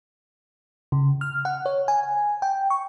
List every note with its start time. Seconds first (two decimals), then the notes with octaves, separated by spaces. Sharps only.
0.92 C#3
1.21 F6
1.45 F#5
1.66 C#5
1.88 G#5
2.42 G5
2.70 C#6